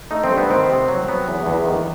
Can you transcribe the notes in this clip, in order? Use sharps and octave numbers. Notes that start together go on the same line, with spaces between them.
A3 D#4
C4
G2
B3
D#3 C4
C3
F#3
F#3 B3
E2
E2
D#3